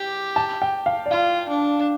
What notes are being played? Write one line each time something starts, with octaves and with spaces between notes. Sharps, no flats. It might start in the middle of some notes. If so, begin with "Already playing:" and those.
Already playing: G4 D6
A5
G5
F5
D5
F4 F5
D4